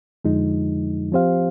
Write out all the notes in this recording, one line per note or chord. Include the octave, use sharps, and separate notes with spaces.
F2 D3 F3 G#3 D#4
F3 C4 G4 C5 F5